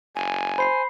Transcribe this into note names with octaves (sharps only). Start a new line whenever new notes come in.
F#1 G#5
C5 B5 C7